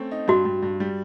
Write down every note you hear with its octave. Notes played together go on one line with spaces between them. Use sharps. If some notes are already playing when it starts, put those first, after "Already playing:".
Already playing: A3 C4 C#4
D#4
G2 F#4
G2
G2
G3